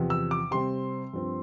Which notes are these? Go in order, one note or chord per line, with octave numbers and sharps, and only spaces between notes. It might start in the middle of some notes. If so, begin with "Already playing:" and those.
Already playing: E2 C3 F3
E6
D6
C3 G3 C4 C6
G2 F3 C4